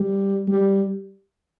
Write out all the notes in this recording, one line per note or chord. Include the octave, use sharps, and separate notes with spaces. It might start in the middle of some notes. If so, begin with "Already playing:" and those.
Already playing: G3
G3